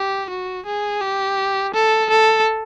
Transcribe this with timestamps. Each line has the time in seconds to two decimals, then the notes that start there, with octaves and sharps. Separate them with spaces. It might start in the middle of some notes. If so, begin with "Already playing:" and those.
Already playing: G4
0.30 F#4
0.66 G#4
1.02 G4
1.74 A4
2.10 A4